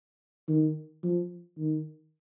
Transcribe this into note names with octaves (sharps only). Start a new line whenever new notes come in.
D#3
F3
D#3